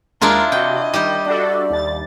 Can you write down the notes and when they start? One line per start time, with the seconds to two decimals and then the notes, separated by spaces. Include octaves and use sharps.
0.22 D#2 G#3 D4 E4 F4 A#4
0.52 C3 F#4 D#5 G5
0.94 D#3 G3 G4
1.26 D4 F#4 A4 D5
1.70 D#2 A6